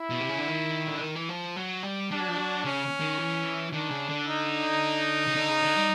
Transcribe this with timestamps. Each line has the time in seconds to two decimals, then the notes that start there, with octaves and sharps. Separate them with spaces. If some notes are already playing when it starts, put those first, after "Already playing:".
Already playing: E4
0.10 B2
0.20 C3
0.29 C#3
0.38 D3
0.48 D#3
0.87 D3
1.01 D#3
1.15 E3
1.29 F3
1.56 F#3
1.83 G3
2.10 G3 D4
2.20 F#3
2.28 F3
2.37 F#3
2.64 C#3 C#4
3.00 D#3
3.18 E3
3.72 D#3 D4
3.91 C#3
4.09 D3
4.27 D#4
5.27 C#3
5.35 D3
5.49 C#3
5.62 D3
5.76 G3